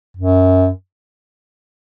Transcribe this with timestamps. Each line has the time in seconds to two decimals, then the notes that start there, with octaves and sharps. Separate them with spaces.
0.17 F#2